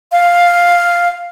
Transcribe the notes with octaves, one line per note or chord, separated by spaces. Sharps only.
F5